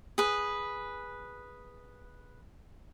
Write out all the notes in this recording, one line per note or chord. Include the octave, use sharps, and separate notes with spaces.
G#4 B4